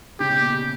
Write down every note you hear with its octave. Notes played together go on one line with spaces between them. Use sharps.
C#3 G4
B2
A#2